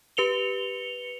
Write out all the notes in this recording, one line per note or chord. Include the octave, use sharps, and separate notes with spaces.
G4 B4 C#7 F7 G7